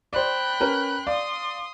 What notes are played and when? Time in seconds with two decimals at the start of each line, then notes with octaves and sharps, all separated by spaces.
0.13 C5 D5 G5 B5 F#6
0.60 C#4 A#4 B4
1.07 D5 F5 C6 D#6